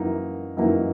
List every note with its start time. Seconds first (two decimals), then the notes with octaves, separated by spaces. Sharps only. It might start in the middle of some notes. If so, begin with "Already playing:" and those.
Already playing: F#2 E3 A#3 D#4
0.57 F#2 E3 A#3 D#4